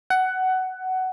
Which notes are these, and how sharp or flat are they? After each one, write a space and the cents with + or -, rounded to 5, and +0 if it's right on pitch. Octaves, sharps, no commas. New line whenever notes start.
F#5 +15